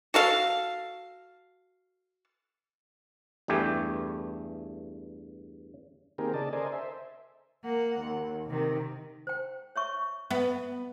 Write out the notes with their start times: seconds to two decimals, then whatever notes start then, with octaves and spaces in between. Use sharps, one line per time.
0.14 F#4 A4 F5
3.48 E2 G2 A3 G4 G#5
6.18 D#3 A#3 C4 G4 G#4 A#4
6.34 C#3 G#4 D5 D#5 A5
6.53 A4 A#4 C5 D5 D#5 G#5
6.72 C5 E5
7.65 A#3 F#5
8.00 D#2
8.49 C3 D#3
9.27 C5 G5
9.76 C#5 E5 C#6
10.31 B3 E5 G5